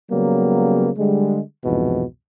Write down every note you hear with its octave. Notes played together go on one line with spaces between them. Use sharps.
C#3 F#3 G3 A#3 B3
D3 G3 G#3
C2 F2 G#2 B2 E3